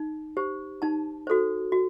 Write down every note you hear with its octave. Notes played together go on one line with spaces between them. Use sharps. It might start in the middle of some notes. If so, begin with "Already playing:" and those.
Already playing: D#4
G4 C5
D#4 A5
F#4 A4 C5
F#4